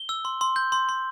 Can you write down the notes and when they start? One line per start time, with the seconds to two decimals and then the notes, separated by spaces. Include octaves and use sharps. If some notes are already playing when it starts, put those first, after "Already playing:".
Already playing: G7
0.09 E6
0.25 C6
0.41 C6
0.56 G6
0.72 C6
0.89 C6